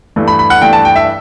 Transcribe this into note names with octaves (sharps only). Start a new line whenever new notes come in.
G2 E3 A3
B5
B5
F#5
G2 E3 A3 G5
A5
G5
E5